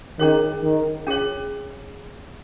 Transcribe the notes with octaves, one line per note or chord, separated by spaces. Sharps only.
D#3 C#4 G#4 C#5
D#3
C#4 G#4 C#5